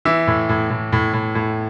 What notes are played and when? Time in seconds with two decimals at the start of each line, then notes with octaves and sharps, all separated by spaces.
0.05 E3 E5
0.27 A2
0.49 A2
0.70 A2
0.92 A2
1.13 A2
1.35 A2